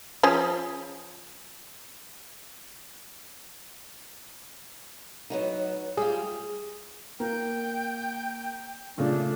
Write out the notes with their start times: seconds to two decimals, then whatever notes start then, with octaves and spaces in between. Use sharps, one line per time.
0.23 F3 C#4 G#4
5.30 F#3 B3 D#4
5.97 G3 F4 G#4
7.20 A#3 G5
8.98 A#2 C#3 A3 D4